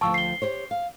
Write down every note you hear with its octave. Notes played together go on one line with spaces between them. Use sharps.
D2 F3 G5 A5 C#6 E6
C7 G7
G4 C5 C#5
F5